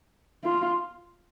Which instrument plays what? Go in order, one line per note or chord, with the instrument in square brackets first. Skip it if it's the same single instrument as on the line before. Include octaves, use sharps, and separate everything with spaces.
[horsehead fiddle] F4